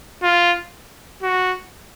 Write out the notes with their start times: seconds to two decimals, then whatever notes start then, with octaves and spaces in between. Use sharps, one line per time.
0.23 F4
1.23 F#4